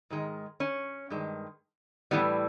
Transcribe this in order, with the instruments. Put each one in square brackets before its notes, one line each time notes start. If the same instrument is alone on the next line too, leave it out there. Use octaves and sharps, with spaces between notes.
[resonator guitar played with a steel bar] G#2 D#3 G#3
C#4
G2 D#3 G#3
A2 E3 G3 B3